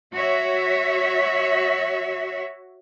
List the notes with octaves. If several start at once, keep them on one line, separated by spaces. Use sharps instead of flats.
F#4 C#5 E5